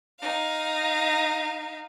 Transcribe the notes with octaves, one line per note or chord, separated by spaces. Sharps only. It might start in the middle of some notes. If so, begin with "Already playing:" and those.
D#4 F5